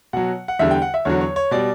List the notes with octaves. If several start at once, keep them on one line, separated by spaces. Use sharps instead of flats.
B2 F#3 F#5
F#5
E2 D3 G3 E5
G5
F#5
E5
E2 D3 F#3 C#5
C#5
C#5
B2 G3 D5